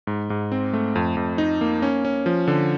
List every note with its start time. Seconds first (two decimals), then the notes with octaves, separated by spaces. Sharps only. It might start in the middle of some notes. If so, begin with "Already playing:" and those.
0.07 G#2
0.30 G#2
0.52 C4
0.73 A3
0.95 F2
1.17 F2
1.38 D#4
1.61 A#3
1.82 C#4
2.05 C#4
2.26 F3
2.48 D3